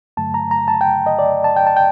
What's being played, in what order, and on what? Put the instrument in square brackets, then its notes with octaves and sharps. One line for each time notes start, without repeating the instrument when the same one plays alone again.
[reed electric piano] G2 D3 F#3 A3 A5
A#5
A#5
A5
G5
D#5
D5
A5
G5
A5
G5